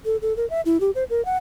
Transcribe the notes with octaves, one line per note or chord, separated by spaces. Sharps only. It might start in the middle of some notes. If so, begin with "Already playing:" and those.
A4
A4
A#4
E5
E4
G4
C5
A#4
F#5